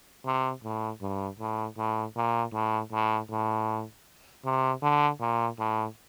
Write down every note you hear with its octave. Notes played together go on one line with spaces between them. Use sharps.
C3
A2
G2
A2
A2
A#2
A2
A2
A2
C3
D3
A#2
A2